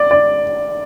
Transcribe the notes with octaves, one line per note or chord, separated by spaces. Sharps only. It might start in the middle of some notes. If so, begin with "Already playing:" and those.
Already playing: D5
D5